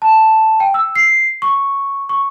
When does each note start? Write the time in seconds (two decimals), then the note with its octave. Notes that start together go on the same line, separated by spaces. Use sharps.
0.02 A5
0.60 G5
0.74 E6
0.96 C7
1.42 C#6
2.09 C#6